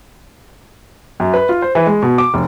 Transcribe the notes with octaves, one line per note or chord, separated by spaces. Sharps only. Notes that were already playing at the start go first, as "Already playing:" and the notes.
F#2
B4
F4
C5
E3
G#3
B2
D6
F1